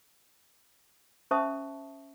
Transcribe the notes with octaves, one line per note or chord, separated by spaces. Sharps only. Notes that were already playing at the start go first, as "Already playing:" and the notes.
C#4 C5 E5 A5 C#6 D#6